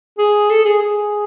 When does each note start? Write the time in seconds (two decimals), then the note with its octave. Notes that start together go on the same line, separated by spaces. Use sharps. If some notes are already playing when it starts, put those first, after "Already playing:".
0.18 G#4
0.50 A4
0.65 G#4
0.82 G#4